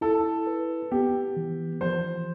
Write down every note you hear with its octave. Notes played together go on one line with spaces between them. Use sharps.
E4 A4
B4
B3 G4
E3
F3 C5